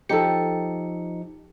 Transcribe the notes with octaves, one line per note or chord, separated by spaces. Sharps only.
F3 D#4 G4 A4 C#7